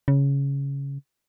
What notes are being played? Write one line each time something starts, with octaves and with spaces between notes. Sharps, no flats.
C#3